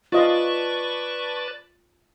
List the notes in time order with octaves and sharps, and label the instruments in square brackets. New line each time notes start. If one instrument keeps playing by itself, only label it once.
[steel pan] F4 D#5 F5 [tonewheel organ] B4 D5 A5 [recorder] C#6